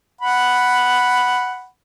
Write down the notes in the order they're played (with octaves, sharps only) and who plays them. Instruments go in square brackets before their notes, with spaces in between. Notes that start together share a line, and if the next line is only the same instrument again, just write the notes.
[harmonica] F#5 B5